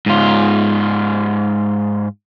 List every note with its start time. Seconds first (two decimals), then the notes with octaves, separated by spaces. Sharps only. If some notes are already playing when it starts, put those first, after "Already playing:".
0.06 G#2 F4